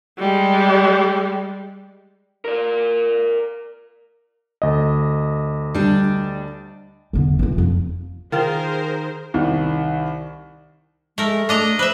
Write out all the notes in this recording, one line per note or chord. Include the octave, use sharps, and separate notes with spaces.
G3 G#3
A#4 D5
D2 D#5
G3 D4
E2 D3
E3 F4
F2
D#3 F4 G#4 A#4 C5 G5
C2 D#3
G#3 A3 A#4
A3 D4 D#5 A#5
B4 C5 E5